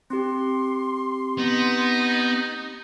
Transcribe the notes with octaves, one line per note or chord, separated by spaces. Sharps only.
C4 G4 C6
B3 D#4